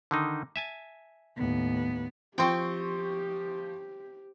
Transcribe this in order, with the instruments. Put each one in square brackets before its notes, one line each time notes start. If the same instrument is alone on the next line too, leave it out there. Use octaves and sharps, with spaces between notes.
[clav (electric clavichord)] D3 D#3 D#4
E5 G#5 A5
[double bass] D#2 A2 [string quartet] B3
[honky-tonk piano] F3 C6 C#6 [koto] C4 G5 [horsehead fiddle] G4